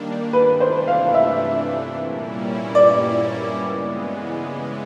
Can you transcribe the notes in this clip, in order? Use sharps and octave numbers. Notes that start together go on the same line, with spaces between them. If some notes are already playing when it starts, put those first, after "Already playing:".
Already playing: D#3 G3 A#3 D4
C3 E3 A3 D4 B4
C5
F5
E5
A#2 G3 A#3 C#4 E4
D5
C#3 E3 G#3 B3